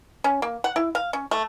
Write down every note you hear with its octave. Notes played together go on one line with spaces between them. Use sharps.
C#4
A#3
F#5
E4
F5
C#4
A3